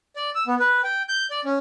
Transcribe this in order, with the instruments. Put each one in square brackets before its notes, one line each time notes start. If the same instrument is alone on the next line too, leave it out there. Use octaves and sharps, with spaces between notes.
[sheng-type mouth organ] D5
E6
B3
B4
G5
G6
D5
C#4